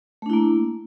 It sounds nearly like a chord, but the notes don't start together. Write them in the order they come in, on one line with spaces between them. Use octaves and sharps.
A3 D4 E4 A#3